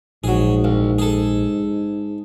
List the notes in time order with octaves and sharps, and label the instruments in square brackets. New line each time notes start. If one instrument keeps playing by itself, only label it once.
[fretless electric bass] A#1 [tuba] G#2 [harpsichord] F#3 G#4
[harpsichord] C2
G#4 A4